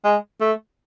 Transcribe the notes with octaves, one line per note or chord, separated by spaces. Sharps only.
G#3
A3